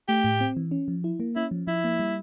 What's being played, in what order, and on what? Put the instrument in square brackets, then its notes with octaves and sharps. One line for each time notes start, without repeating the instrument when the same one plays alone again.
[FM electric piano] A3 [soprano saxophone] G4
[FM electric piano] A2
C4
E3
C#4
F3
E4
A#3
[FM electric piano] C#4 [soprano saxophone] E4
[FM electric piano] F3
[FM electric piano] F3 [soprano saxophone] E4
[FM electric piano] A#3
G3